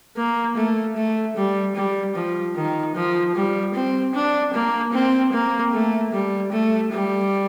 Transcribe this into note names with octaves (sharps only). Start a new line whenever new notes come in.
A#3
A3
A3
G3
G3
F3
D#3
F3
G3
C4
D4
A#3
C4
A#3
A3
G3
A3
G3